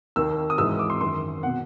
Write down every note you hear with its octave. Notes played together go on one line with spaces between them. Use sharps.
D#2 D#3 E6
D#6
G#2 E3 E6
D#6
D6
C6
F#2 D#3 C6
B2 F#5